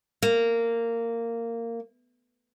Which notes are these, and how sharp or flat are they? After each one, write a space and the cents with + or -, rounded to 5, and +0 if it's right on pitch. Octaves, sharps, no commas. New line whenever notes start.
A#3 -15